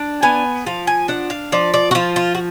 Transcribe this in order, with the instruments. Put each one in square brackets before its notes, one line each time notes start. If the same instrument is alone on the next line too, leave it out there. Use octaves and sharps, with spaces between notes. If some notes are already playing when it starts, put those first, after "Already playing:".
Already playing: [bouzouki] D4
B3 G#5
F3 F5
G#5
D4 F#5
F5
F3 D5
D5
F#4
F3 F4
F4
F#4